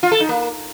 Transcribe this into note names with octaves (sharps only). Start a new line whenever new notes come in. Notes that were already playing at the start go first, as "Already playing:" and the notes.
F4
A4
D#4
A#3